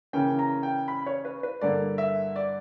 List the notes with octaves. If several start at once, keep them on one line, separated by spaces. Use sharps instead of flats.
C#3 E3 A#3 C#4 G5
A#5
G5
B5
C#5
B4
B4
G2 D3 A#3 D5
E5
D5